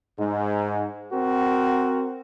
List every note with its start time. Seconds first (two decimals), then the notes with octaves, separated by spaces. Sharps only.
0.19 G#2
1.13 C4 F#4 A#4